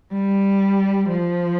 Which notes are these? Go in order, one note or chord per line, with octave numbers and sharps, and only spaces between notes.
G3
F3